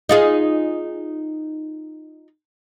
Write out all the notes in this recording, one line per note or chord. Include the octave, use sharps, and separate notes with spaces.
D#4 F4 G#4